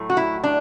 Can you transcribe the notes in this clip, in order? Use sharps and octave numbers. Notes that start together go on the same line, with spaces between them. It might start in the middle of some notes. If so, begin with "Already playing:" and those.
Already playing: A2 F#3 A3
F#4
E4
D4